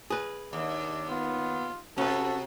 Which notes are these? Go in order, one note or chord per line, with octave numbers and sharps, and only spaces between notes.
G#4 B4
D#2 D4
B3 F4
C3 C#4 F#4 A4 B4